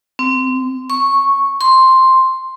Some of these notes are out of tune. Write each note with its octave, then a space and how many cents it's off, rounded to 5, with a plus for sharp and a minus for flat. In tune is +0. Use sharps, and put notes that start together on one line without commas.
C4 -20
C#6 -5
C6 +5